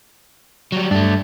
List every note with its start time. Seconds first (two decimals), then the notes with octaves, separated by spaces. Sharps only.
0.72 F#3 G3
0.91 G2 A3 D4